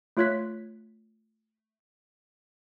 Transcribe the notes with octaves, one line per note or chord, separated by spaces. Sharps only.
A3 F4 C#5 F#6 G#6 B6